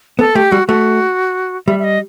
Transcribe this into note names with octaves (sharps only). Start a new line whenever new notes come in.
B3 A4
A3 G4
G3 F#4
A3 F#4
G3 E5
E5
D#5